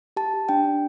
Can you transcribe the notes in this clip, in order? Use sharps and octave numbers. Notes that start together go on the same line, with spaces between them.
G4 A5
G4
D4 G5
D4